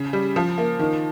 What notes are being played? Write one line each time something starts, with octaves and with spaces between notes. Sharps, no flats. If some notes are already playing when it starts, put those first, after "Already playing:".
Already playing: C#3
G3
F3
A#3
D#3